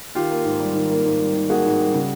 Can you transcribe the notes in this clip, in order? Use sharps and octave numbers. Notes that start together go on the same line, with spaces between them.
D#3 F4 G4
A#3
G#2
G3
D#3
A#3
G#2
G3
D#3
A#3 F#4 G#4
G#2
G3
C#3